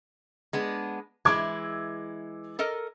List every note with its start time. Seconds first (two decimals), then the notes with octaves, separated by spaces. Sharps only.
0.53 G#3 B3 D4
1.25 E3 G#3 E4 D6 G#6
2.59 A4 A#4 D#5